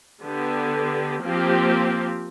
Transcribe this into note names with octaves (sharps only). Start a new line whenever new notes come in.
D3 B3 G4
F3 A#3 C4 G4